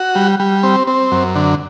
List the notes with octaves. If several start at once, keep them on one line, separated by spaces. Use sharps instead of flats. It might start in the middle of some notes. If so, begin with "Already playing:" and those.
Already playing: F#4
G3
G3
C4
C4
F#2
D3